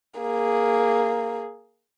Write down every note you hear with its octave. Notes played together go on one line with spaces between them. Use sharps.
A#3 G#4